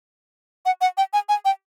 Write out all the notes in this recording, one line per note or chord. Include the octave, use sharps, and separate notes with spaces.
F#5
F#5
G5
G#5
G#5
G5